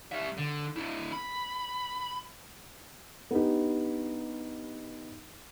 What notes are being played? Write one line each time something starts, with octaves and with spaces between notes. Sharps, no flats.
G3 E5
D3
D4 E4
B5
B3 D4 D#4 G4